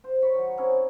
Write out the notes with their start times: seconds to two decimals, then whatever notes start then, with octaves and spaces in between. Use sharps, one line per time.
0.04 C5
0.22 C#5 B5 C#6
0.35 D#3 F#3
0.57 C4 C#4 D#4 E4